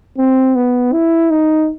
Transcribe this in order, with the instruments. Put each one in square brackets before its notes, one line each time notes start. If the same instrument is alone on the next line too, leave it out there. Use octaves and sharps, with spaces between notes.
[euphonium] C4
B3
E4
D#4